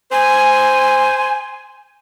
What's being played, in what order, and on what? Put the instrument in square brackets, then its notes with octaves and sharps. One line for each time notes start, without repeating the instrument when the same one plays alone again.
[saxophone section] C5 [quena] G#5